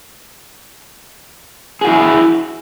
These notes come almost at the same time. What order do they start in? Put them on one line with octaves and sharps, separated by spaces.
G#4 F#4 E4